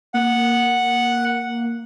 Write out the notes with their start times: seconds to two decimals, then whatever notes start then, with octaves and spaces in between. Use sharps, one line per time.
0.14 A#3 F#5